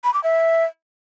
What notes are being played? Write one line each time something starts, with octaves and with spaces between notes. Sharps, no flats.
B5
D6
E5